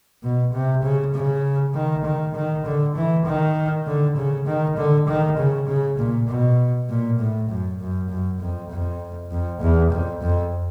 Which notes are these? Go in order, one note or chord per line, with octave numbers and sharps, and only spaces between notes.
B2
C3
C#3
C#3
D#3
D#3
D#3
D3
E3
D#3
D3
C#3
D#3
D3
D#3
C#3
C#3
A#2
B2
A#2
A2
F#2
F#2
F#2
F2
F2
F2
E2
F2
F2